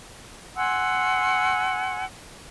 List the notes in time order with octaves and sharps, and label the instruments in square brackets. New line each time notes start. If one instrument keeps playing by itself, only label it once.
[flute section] F#5 G#5 C6 E6